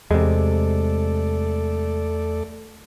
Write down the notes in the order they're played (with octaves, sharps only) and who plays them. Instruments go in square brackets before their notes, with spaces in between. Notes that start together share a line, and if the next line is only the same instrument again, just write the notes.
[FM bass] E2 [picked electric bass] C3 G#3 [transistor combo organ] A3 A4 D5